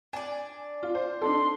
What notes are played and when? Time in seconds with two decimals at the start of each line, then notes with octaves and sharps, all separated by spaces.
0.13 D4 D5 G#5
0.83 F4
0.95 C5
1.22 D4 D#4 A4 C6